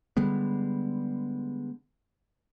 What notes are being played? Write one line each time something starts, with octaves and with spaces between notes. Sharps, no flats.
D3 G3 G#3 B3